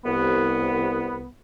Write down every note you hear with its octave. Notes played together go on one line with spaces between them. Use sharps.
C2 B3